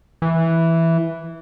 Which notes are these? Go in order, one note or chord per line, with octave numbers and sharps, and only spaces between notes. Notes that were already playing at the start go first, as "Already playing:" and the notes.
E3